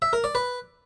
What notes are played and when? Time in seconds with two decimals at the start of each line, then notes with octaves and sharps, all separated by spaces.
0.02 E5
0.13 A#4
0.24 D5
0.35 B4